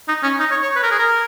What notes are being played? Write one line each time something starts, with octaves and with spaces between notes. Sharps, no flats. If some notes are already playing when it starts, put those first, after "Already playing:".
D#4
C#4
D#4
C#5
C#5
B4
A#4
G#4
A#4